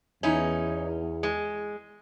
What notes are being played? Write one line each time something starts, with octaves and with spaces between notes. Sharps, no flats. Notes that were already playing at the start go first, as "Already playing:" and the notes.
E2 C#4 D#4 E4
G#3